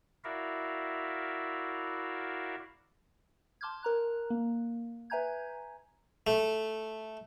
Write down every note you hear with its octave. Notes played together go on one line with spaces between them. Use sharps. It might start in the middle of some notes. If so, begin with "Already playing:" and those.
E4 F#4 A#4 D5 E5 F5
A5 C6 D6 F6 G6 G#6
A#4 A#5 F#6
A#3
B4 E5 G#5 A#5 G6 G#6
A3